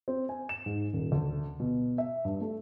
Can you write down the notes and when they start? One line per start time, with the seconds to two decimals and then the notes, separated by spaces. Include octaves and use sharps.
0.08 C4
0.29 G#5
0.49 E7
0.66 G#2
0.93 D#1
1.12 D2
1.60 B2
1.98 E5
2.25 G2
2.41 A3